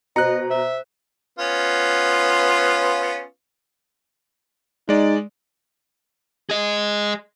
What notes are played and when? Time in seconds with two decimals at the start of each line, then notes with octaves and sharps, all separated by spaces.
0.16 B2 C5 D#5 A#5 F#6 C#7
0.50 C5 E5
1.39 B3 C#4 F4
4.89 G#3 D#4 D5
6.50 G#4 D#5